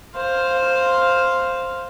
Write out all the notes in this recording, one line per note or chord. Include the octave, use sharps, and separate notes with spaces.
C5 F5